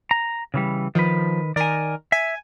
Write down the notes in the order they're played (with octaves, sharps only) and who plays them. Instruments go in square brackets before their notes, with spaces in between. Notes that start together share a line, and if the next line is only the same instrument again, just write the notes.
[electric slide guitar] A#5
C#3 E3 G3
[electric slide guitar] D#3 B4 [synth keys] F3
[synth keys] D#3 A#4 [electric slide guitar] D5 G#5
[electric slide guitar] E5 [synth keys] G#5